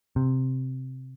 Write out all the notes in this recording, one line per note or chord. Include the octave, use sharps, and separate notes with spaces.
C3